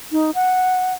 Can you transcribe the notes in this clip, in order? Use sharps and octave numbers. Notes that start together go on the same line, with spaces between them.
D#4
F#5